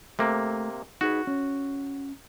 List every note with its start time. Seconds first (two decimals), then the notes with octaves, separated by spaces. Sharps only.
0.19 C3 A3 A#3
1.01 D#4 F#4 G#4 B4
1.27 C#4